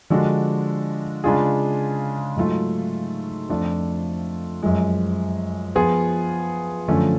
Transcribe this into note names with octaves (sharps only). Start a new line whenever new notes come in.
D3 F3 G#3 D4 F#4
C#3 G#3 D4 F4 G#4
G#2 F#3 A3 F4
F2 F3 A3 D4 F4
F#2 F3 G#3
F3 B3 F4 G#4
F#2 D3 F3 A3 C#4